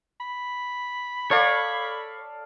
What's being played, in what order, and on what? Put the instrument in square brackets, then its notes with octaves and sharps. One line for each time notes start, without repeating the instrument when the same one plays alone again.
[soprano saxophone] B5
[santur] A4 D5 F5 [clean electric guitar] C#5